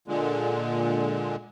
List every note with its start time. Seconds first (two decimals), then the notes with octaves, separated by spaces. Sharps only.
0.08 A#2 D3 G#3